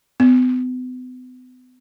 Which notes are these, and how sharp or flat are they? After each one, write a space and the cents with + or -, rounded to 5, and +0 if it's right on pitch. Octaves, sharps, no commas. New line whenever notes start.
B3 +40